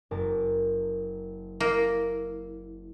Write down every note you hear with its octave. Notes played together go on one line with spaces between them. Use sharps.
F#1 A#4 A5
A#3 E4